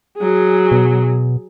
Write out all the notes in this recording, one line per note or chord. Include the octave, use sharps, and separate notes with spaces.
F#3 G#4
B2